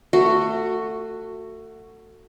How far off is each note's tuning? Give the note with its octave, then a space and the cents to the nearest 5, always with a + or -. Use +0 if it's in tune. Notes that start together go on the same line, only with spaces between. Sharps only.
A3 +25 F#4 +0